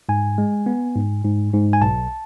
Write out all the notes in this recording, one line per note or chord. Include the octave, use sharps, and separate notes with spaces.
G#2 G#5
G#3
B3
G#2
G#2
G#2
G#5
B1 A5